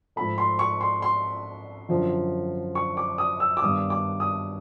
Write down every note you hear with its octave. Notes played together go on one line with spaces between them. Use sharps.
G#2 F3 A3 B5
C6
C#6
C6
C6
F#2 D3 F3
C#6
D6
D#6
E6
D6
G2 D#3 G3 B3 D#6
D6
D#6